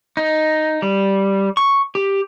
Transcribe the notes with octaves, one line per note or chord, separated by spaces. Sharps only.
D#4
G3
C#6
G4